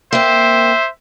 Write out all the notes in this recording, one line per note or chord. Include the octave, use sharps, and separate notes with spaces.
A#3 C4 C5 E5